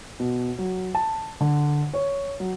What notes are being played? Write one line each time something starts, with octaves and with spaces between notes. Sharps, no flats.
B2
F#3
A5
D3
C#5
F#3